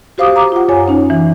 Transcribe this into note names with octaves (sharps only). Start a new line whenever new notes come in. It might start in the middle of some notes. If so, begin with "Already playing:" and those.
F#4 G4 C5 F5 D6 D#6
A#5 D6
F4 F#5
F#2 C#5 G#5
C#4 D#4
E3